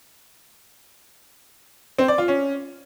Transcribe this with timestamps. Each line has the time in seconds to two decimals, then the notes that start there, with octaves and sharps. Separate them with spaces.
1.99 C4
2.08 D5
2.18 F4
2.28 C#4